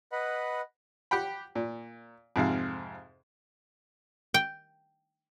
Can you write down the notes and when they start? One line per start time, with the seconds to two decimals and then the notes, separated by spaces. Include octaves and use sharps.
0.12 B4 D#5 F#5 B5
1.11 G4 F#5 G5 B5
1.55 A#2
2.36 F2 G#2 C3 F5
4.34 G5